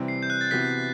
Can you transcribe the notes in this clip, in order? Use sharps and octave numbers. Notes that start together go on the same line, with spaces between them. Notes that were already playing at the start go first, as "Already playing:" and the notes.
Already playing: C3 E3 G3 C4
C7
G6
F#6
A6
C3 E3 B3 F#4 B6